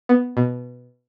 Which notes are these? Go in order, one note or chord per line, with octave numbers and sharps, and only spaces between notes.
B3
B2